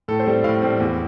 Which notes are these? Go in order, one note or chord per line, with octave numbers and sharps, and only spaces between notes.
A2 A4
C5
G3 C4
A2 F5
G3 C4
E2